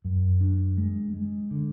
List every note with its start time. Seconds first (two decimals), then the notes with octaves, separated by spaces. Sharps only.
0.05 F#2
0.41 D4
0.78 G#3
1.14 G#3
1.51 D3